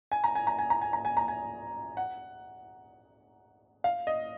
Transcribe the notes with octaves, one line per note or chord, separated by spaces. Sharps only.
G#5
A#5
G#5
A#5
G#5
A#5
G#5
A#5
G#5
A#5
G#5
F#5
F5
D#5